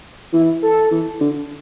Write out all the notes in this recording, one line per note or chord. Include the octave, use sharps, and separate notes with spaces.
E3 E4
A4
E3
D3